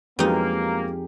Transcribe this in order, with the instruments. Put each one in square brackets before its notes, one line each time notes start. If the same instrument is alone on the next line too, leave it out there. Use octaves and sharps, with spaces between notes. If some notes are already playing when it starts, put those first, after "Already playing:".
[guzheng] F2 D#4 [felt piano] F#3 G#3 B3 [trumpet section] A#3 [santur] G4 G#4